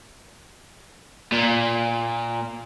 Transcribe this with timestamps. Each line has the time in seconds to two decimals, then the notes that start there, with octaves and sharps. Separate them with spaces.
1.32 A#2